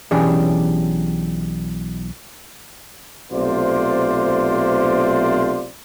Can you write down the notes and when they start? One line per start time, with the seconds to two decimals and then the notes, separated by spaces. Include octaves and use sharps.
0.11 B1 E3 C#4 D4 G4 G#4
3.32 B1 C3 A3 F4 C5 D5